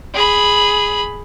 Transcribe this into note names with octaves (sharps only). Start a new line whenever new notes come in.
G#4 B5